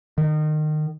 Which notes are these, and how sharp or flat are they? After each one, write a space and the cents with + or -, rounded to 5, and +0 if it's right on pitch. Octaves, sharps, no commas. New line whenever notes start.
D#3 -30